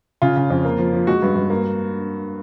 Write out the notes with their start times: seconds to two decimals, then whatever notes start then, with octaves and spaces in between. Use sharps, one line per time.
0.22 C#3 F4
0.36 C#3
0.50 F2
0.65 A#3
0.79 F3
0.93 F3
1.07 G#3 F#4
1.22 G2
1.35 G2
1.50 A#3
1.64 A#3